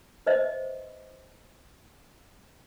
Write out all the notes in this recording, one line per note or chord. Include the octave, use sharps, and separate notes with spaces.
B4 C5 D#5 E5